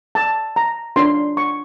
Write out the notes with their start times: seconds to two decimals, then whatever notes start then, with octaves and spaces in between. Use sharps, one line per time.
0.15 A5
0.56 A#5
0.96 D4 F4 A#4 C#5 C6
1.37 C#6